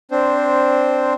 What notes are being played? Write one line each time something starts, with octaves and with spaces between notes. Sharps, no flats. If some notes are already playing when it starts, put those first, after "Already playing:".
C4 D4 C5